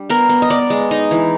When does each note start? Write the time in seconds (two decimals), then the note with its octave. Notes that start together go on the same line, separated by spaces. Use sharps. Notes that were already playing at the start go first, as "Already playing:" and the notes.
Already playing: G3 D4
0.10 B3 A#4
0.29 B3
0.42 D#5
0.50 B3 D5
0.70 G#3
0.91 D#4 D#5
1.11 E3